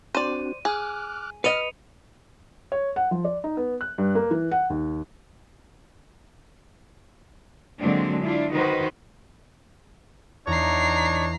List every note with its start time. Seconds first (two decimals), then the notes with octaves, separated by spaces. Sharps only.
0.15 C4 D4 F#4 C5 D5 D#7
0.65 G#4 D6 F6 F#6
1.44 B4 D#5 F6 C#7 D#7 F7
2.72 C#5
2.96 F#5
3.11 F3
3.24 D5
3.44 D#4
3.57 B3
3.81 F#6
3.98 G2
4.15 A#3
4.31 E3
4.52 F#5
4.70 D#2
7.80 D3 F#3 G#3 A#3 C4 D4
8.24 D4 E4 F4
8.53 D#3 D#4 F#4 B4 C5
10.47 E2 D4 D#4 C#5 A#5 C7